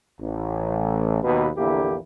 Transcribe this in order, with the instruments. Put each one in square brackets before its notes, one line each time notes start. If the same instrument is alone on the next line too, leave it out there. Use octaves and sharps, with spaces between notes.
[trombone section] A1
D#2 B2 B4
A#1 E2 D3 A#3 E4 G4